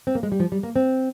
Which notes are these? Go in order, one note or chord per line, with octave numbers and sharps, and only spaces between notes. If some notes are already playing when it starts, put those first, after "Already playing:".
C4
A#3
G#3
G3
F3
G3
A#3
C4